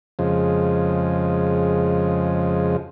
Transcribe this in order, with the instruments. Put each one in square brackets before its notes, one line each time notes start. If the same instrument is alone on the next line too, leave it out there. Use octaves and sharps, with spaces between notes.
[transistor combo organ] F2 C#3 F3 G#3